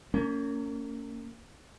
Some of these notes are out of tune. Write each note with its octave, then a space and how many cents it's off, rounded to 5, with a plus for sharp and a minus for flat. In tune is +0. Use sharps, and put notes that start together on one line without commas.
A#3 -30 C#4 +20